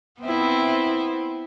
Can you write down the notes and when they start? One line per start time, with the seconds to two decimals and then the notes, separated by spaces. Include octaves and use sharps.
0.21 B3 C4 E4